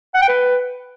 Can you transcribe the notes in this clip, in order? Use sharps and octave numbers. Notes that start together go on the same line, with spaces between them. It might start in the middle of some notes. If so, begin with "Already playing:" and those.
F#5
G5
B4